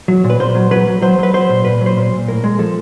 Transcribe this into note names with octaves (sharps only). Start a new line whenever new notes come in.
F#3
A#2
B4
A#2 C5
F#3
F#3 B4
F#3
F#3 C5
F#3 B4
F#3 C5
A#2
A#2 B4
F#3
C5
A#2
A#2
A2 A#4
G#3
F3 A4